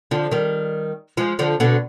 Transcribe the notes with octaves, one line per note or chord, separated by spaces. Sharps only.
D3 F3
D#3 G3
F3 G#3
D3 F3
B2 D3